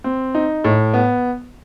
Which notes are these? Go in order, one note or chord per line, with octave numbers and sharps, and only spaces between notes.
C4
D#4
A2
B3